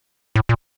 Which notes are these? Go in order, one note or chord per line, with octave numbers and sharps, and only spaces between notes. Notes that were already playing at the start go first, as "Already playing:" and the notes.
A2
A#2